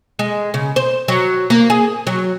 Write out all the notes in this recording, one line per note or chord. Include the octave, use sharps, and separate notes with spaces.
G#3
C#3
C5
F#3
A#3
G#4
F#3